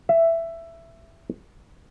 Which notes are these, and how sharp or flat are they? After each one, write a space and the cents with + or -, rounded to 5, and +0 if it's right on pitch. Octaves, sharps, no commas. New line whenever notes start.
E5 +10